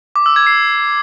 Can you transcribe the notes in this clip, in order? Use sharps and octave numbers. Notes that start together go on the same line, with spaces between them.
D6
E6
G#6
C7